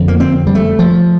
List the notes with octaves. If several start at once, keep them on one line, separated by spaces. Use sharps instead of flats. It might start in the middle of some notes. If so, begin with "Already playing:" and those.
Already playing: F2 D3
A#3
C4
G3
A3
F3